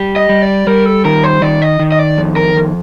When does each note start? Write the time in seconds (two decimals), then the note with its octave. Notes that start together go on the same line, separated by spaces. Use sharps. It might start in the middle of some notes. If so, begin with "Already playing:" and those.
Already playing: G3 G4
0.16 D#5
0.29 G3
0.42 D5
0.67 G3 A#4
0.86 A4
1.05 D#3 A#4
1.24 C5
1.42 D#3 D5
1.62 D#5
1.80 D#3
1.92 D#5
1.99 D5
2.18 F2
2.36 A#4
2.56 F2